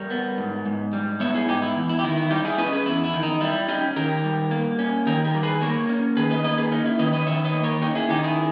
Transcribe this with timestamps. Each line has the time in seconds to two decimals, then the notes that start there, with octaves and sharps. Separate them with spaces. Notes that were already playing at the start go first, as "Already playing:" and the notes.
Already playing: G3 A#4 C#5
0.10 B3
0.38 G#2
0.66 G#2
0.93 G3
1.20 B3 C#5 E5
1.34 E4 G#4
1.48 G#2 D#4 G4
1.62 E4
1.76 E2
1.89 E4
1.99 G4
2.04 D#3 E4
2.18 E4
2.30 G3 D#4 G4
2.45 E4 G#4
2.58 C#4 B4 D#5
2.72 G#4 B4
2.86 E2 E4
3.04 E4
3.13 D#3
3.23 D#4
3.41 G3 E4
3.68 C#4 D#4 G4
3.96 D#3 G4 A#4
4.24 G3
4.51 A#3
4.79 C#4
5.07 D#3 G4 A#4
5.24 G4 A#4
5.34 G3
5.43 G#4 B4
5.61 A#3 A#4 C#5
5.89 C#4
6.16 D#3 G#4 B4
6.30 B4 D#5
6.44 A#3 B4 D#5
6.57 G#4 B4
6.71 C#4 D#4
6.86 E4
6.99 D#3 B4 D#5
7.13 B4 D#5
7.27 D#3 C#5 E5
7.45 B4 D#5
7.54 A#3
7.63 A#4 C#5
7.82 C#4 D#4 G4
7.95 E4 G#4
8.09 D#3 D#4 G4
8.23 E4 G#4